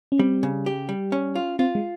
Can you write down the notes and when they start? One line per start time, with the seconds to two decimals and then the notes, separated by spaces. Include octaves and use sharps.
0.12 C#4
0.19 G3 C4
0.43 C#3
0.66 G4
0.89 G3
1.12 C#4
1.35 F4
1.59 C4 F4
1.75 G#3